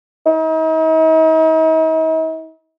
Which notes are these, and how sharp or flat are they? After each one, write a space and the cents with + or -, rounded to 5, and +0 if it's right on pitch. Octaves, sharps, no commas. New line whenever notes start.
D#4 +45